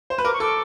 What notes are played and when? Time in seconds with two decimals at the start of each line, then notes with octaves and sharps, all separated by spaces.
0.10 C5
0.18 B4
0.25 A#4 D6
0.34 C#6
0.40 A4 D6